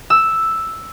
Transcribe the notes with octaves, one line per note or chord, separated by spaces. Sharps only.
E6